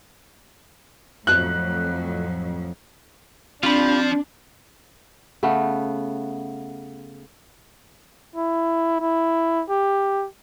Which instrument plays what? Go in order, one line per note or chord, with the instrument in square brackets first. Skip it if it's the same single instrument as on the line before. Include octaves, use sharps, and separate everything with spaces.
[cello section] F2 A2 F#3 [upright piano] F#6
[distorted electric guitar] F3 [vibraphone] C4 [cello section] D4 [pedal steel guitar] F4 G4 B5
[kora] C#3 A3 B3
[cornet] E4
E4
G4